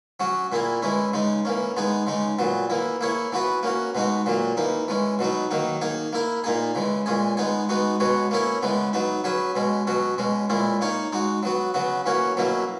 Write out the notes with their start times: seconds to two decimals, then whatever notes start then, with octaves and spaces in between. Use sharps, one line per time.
0.20 F#3 C#4 F#4
0.52 A#2 A#3 E4 G#4
0.82 E3 G#3 C#4 E4
1.13 C#3 G#3 D#4
1.45 E3 A#3 C#4
1.77 G#3 B3 D#4 G#4
2.07 C#3 G#3 D#4
2.39 A#2 F#3 B3
2.70 E3 A#3 E4
3.01 A#3 E4 G#4 C#5
3.32 E3 B3 F#4 B4
3.63 A#3 C#4 F#4
3.95 B2 G#3 D#4 F#4
4.26 A#2 F#3 A#3
4.57 E3 A#3 D#4
4.88 E3 G#3 C#4
5.19 B2 F#3 B3 D#4
5.51 D#3 F#3 A#3 D#4
5.81 A#3 D#4 G#4
6.13 A#3 E4 A#4
6.44 A#2 A#3 D#4 G#4
6.75 C#3 E3 G#3
7.06 A#2 G#3 C#4 G#4
7.37 G#3 B3 D#4 G#4
7.69 G#3 B3 D#4 F#4
8.00 B2 G#3 B3 F#4 C#5
8.31 A#3 C#4 E4 A#4 C#5
8.63 C#3 E3 G#3 B3
8.93 F#3 B3 D#4
9.24 F#3 C#4 G#4 B4
9.55 B2 G#3 C#4
9.87 B2 F#3 C#4 F#4
10.18 B2 G#3 C#4
10.50 A#2 G#3 C#4 E4
10.81 A#3 D#4 A#4 C#5
11.12 G#3 D#4 F#4
11.43 F#3 B3 F#4
11.74 C#3 F#3 B3 F#4
12.06 E3 A#3 C#4 F#4 C#5
12.37 B2 F#3 A#3 C#4 E4